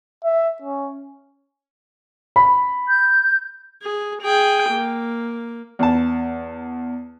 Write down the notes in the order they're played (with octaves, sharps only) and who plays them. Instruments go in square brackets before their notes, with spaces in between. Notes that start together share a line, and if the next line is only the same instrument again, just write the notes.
[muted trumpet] E5
C#4
[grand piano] B5
[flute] G6
[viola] G#4
G#4 G5
A#3
[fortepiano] E2 A5